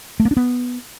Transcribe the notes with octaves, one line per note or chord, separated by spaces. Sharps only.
A3
A#3
D4
B3